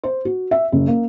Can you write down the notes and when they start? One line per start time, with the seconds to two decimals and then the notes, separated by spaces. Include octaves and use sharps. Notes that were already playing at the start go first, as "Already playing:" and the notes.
0.04 C5
0.25 F#4
0.51 E5
0.72 F#1
0.87 A#3